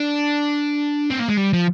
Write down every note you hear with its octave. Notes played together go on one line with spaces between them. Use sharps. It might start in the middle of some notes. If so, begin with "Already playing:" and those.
Already playing: D4
C4
A#3
G#3
G3
F3